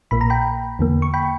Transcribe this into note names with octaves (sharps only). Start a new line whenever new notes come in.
A#1 A#2 A#3 B5
A#5
G5 B5
E2 D3 A#3
C#6
G5 B5